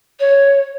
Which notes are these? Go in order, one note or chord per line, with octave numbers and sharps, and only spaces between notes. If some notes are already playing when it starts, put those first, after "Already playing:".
C#5